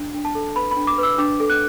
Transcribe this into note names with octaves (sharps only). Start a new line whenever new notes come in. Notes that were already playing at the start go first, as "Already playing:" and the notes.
Already playing: D4
D4
A5
A4
B4 B5
B5
D4
D6
B4 E6
D4 D6
A4
F#6